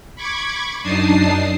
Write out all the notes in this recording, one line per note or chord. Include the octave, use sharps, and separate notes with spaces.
B5 C#6 D6 G#6
F#2 D4 D#4 A5 D#6 C7